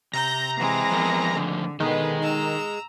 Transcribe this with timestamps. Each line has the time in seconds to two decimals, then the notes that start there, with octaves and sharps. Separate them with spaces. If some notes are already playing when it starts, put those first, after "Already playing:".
0.13 C3 A#5 G6 A#6
0.57 E3 G#3 C4
0.91 F3 B3 A#4
1.36 A2 D3 D#3 F3
1.80 B2 D3 D#3 G#4 B4 D#5
2.21 A#5 E6